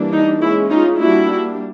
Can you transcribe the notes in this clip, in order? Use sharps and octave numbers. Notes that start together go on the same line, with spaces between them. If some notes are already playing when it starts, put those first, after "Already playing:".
Already playing: E3 G3 A#3 D4
D#4
G#3 C#4 E4
D#4 F4
G3 A#3 D4 E4 F#4